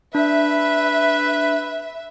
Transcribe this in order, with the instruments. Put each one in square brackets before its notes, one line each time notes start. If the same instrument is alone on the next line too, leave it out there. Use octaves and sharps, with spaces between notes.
[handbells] D4 [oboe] B4 [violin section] E5